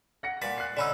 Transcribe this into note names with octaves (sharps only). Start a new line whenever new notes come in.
F#5 A#6 C#7
A#2 B4 A6
F#6 C7
D3 C#4 D#4 D5 B5 E6